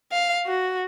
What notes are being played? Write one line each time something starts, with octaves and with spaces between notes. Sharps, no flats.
F5
F#4